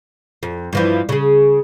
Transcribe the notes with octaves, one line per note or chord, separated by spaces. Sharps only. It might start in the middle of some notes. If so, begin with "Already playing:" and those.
F2
G2 E3 F3
C#3 G#4